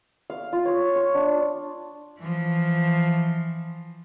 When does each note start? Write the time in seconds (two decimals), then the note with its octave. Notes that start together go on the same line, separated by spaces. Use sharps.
0.30 F5
0.53 F4
0.65 C#5
0.95 C#6
1.15 D4
2.18 E3 F3